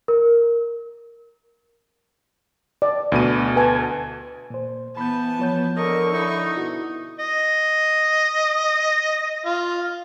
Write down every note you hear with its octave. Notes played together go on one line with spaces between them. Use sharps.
A#4
D5
D2 B2 D#7
B4 G#5 A5
A#2 C5
E3 B3 A5 B5 G6
F3 C#5 G6
D3 A#4 D#5 C#6
D#4 E4
B2 E4 F#4
D#5
F4